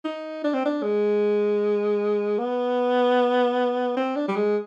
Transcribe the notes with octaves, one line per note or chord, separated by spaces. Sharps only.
D#4
D4
C4
D4
G#3
B3
C4
D4
G3
G#3